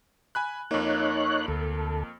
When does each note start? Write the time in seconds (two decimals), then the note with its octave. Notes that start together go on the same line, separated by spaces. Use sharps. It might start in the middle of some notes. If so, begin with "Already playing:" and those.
0.35 G#5 B5 F#6
0.71 F2 A#3 D#4 C#5 F#6
1.48 D2 A4